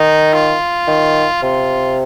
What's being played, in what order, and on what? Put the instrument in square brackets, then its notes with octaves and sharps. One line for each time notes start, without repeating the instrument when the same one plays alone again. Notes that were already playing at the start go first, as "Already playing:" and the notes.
Already playing: [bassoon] D#3 [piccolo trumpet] D#4
[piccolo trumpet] F4
[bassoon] D#3
[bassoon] C3 [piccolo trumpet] F4